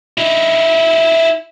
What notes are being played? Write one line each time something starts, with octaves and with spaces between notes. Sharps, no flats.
D#4 E4